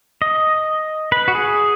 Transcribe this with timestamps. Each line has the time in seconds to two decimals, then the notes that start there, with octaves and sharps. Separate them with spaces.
0.22 D#5
1.12 B4
1.28 F#4
1.35 G#4